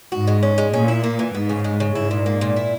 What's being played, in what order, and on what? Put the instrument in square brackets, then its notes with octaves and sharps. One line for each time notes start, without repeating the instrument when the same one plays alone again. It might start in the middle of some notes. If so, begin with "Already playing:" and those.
[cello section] G#2 [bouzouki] F#4
[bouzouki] G#3
C#4
G#3
[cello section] A#2 [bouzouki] C#4
[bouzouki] E4
A#3
E3
[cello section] G#2 [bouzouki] B3
[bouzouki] C#3
G#3
C#3
[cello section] G#2 [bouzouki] E4
[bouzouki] A#2
A#3
A#2
E4